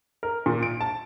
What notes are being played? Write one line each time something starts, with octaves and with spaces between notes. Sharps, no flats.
A#4
A#2
D7
A5